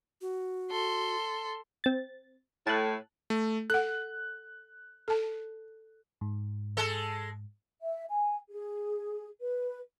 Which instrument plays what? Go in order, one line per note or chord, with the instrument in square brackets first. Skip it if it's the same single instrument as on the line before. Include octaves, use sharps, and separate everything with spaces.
[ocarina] F#4
[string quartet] A4 C6
[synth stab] C4 A6
[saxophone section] A2 [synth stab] A5 F#6
[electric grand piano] A3
[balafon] A4 F#5 [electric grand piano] F#6
[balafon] A4 A5
[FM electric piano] G#2
[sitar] G#3 A4
[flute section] E5
G#5
G#4
B4